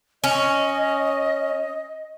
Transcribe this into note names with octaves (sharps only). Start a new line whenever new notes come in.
C#4 D#5